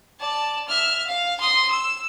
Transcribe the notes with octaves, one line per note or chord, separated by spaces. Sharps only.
D5 A5
E5 F6
F5
C6 D#6
E6